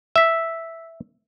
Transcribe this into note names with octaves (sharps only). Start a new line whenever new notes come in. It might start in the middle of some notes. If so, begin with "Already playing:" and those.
E5 E6 B6